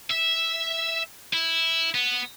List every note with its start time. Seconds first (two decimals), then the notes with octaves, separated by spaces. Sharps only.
0.10 E5
1.33 E4
1.95 B3